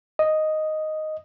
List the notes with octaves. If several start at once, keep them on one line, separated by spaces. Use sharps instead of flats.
D#5